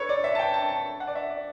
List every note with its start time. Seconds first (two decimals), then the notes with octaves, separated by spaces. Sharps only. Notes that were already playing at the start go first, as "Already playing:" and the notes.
Already playing: A4 B4 C#5
0.09 D5
0.24 E5
0.35 A5
0.39 G5
0.54 A5
0.69 A5
1.00 F#5
1.07 D5
1.15 E5
1.30 D5